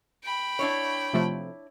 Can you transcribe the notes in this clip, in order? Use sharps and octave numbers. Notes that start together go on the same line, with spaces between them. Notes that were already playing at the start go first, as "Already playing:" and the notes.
G5 B5
D4 E4 C#5
C3 F3 A3